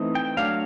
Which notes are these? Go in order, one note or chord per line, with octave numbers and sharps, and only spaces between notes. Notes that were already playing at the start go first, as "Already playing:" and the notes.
Already playing: E3 A3 C4 D#4
G5
F#3 A3 D4 F5